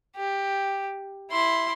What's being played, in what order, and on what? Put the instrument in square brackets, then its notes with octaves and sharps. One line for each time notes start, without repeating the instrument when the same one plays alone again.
[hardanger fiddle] G4
E4 C6